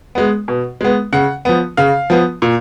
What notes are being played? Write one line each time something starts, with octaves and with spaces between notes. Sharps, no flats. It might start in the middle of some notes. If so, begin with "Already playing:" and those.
G#3 B3
B2
G#3 B3
C#3 F#5
F3 B3
C#3 F5
F3 B3
A#2